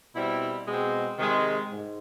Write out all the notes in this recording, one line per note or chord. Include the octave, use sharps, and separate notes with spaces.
B2 G3 C4 E4
B2 G#3 C4
C3 D#3 G#3
G#2